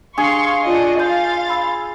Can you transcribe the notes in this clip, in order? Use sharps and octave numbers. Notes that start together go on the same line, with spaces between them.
D4 G#4 F5 C6 C#6
D4 F4 D#5
F5 C6 G6 A6
B5 E6